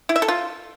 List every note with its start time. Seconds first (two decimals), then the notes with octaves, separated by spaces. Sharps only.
0.09 E4
0.16 E5
0.22 A4
0.28 F4